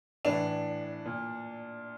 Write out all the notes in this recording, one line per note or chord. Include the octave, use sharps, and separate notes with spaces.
A2 E3 D4
A#2